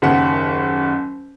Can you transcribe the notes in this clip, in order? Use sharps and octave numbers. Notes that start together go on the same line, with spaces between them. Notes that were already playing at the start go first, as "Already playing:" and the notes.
F#1 D#2 F#5